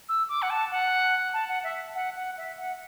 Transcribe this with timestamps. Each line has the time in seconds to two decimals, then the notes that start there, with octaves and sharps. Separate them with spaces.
0.09 E6
0.29 D6
0.42 F#5
0.50 A5
0.71 F#5
1.33 A5
1.48 F#5
1.64 E5
1.95 F#5
2.16 F#5
2.38 E5
2.58 F#5